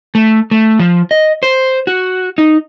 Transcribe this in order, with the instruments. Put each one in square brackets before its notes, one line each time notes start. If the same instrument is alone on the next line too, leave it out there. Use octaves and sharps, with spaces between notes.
[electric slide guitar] A3
A3
F3
D#5
C5
F#4
D#4